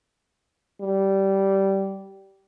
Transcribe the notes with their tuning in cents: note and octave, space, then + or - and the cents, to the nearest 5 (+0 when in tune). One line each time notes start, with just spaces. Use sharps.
G3 -15